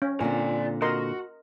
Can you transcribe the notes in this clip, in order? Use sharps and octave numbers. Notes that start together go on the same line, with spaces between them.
C#4
A#2 D3 C4 D5 G#5
F#4 A#4 D#5 C6